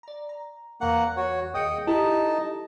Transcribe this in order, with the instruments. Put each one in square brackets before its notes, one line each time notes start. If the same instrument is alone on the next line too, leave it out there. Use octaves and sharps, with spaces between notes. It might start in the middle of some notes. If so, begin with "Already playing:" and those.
[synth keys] D5 A#5
A#5
[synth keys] E2 C#6 [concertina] A#3 F#5
[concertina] F#4 C#5
[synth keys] D#2 G#4 C#7 [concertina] D#5 G5 D#6
[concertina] D#4 D#5 A5 [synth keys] E4 G4 A4